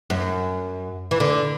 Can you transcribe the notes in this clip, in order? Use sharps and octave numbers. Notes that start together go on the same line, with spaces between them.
F#2
E3
D3